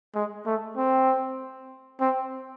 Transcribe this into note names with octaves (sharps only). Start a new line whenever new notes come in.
G#3
A3
C4
C4